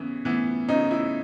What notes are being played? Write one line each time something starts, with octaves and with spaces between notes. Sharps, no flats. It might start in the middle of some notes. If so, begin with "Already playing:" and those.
Already playing: C#3 E3 B3
E3 B3
C#3 D#4
E4